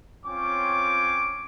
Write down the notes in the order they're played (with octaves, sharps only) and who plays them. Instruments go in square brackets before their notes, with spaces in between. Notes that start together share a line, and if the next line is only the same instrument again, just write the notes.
[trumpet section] C4 C#4 F4 C#5 G5 D6